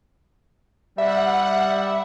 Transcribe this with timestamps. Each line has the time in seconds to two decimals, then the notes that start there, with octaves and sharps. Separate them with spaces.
0.98 G3 E5 F#5